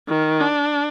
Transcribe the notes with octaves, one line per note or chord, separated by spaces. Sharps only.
D#3
D4